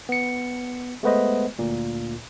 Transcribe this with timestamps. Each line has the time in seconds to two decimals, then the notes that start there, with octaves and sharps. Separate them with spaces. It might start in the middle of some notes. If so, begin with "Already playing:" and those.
0.09 B3 C#7
1.03 G#3 A3 B3 B4 C5 D#5
1.59 D2 A#2